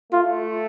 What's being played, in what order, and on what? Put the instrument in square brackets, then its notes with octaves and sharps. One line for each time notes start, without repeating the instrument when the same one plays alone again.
[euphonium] A3 [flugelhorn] F4